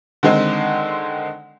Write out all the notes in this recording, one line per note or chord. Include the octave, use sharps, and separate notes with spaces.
D3 D#3 G#3 C4 D#4